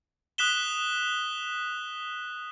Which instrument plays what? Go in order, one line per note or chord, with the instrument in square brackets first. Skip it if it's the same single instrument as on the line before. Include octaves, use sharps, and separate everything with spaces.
[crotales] D#6 F#6 B6 E7 G7